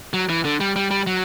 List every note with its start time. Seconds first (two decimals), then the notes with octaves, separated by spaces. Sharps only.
0.13 F#3
0.29 E3
0.45 D3
0.60 G3
0.76 G3
0.91 G3
1.07 F#3